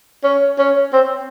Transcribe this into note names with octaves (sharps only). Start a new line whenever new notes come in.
C#4
C#4
C4